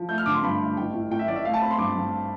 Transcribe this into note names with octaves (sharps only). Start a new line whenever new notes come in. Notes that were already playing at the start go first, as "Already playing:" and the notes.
Already playing: F3
A3 G6
F6
D3 D6
C6
G2 B5
A3
A1 G5
A2
A2 G5
E5
A1 D5
E5
A3 F5
A5
C4 B5
C6
G2 D6
G2